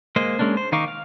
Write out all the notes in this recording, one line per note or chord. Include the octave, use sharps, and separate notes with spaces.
G#3 A#3 C5 D#5
G#3 A#3 C#4 D4
C5
D#3 D#4 F5 C#6 D6
F5